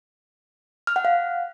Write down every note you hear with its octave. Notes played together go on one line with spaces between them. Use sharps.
F6
F#5
F5